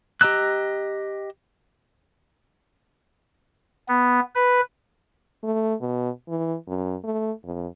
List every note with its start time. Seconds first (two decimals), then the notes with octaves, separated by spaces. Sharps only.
0.21 G4 D#5 A#5 E6 F#6
3.89 B3
4.35 B4
5.44 A3
5.81 B2
6.28 E3
6.68 F#2
7.04 A3
7.44 F2